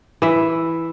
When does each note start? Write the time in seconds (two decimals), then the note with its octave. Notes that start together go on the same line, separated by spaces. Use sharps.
0.22 E3 E5